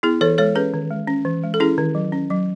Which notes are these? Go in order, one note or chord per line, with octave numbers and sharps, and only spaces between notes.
B3 E4 G#4
E3 A4 C#5
G#3 A4 C#5
C#4 G#4 B4
D#3
G#3
C#4
E3
G#3
A4
C#4 E4 G#4
D#3
F#3
C#4
F#3